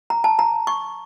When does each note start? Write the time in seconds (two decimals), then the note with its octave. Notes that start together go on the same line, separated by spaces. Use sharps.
0.10 A#5
0.24 A5
0.39 A#5
0.67 C#6